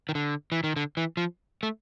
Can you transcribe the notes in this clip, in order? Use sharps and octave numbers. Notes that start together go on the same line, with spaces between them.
D#3
D3
E3
D#3
D3
E3
F3
A3